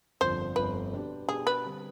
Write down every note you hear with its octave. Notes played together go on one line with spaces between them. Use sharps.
G1 F2 D3 F3 C5
G1 F2 D3 F3 B4
B2 B3 D4 G4
B2 B3 D4 G4 G#4
B4
D3 G3 C4